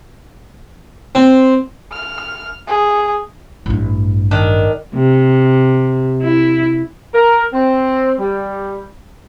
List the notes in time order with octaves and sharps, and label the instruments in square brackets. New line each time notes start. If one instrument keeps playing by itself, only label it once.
[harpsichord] C4
[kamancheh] F6
G#4
[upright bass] A1 G2
[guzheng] D#3 D4
[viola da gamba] C3
E4
[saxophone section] A#4
C4
G3